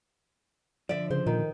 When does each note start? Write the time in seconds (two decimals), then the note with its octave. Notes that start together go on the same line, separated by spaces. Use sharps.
0.89 D3 F3 D5 E5
1.10 C#3 C5
1.26 A#2 D#3